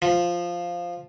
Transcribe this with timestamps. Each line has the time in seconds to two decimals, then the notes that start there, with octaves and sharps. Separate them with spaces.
0.02 F3